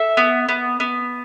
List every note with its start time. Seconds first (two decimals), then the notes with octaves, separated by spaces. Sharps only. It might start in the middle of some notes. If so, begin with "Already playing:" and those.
Already playing: A4 E5
0.17 B3
0.49 B3
0.80 B3